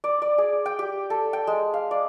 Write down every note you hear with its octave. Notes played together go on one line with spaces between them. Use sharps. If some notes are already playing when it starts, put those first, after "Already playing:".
D5
D5
G#4
G5
G4
A4
G5
G#3
F5
D5